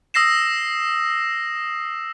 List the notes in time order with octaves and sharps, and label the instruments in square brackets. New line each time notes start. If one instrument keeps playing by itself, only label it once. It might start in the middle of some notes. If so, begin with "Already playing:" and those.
[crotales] D#6 E6 A#6 C7 E7